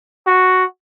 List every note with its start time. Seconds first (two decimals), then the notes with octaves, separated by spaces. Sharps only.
0.27 F#4